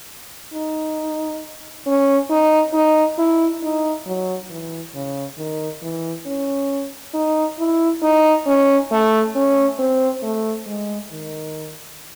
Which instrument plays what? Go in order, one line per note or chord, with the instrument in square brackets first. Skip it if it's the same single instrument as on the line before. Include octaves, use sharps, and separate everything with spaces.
[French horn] D#4
C#4
D#4
D#4
E4
D#4
F#3
E3
C#3
D#3
E3
C#4
D#4
E4
D#4
C#4
A3
C#4
C4
A3
G#3
D#3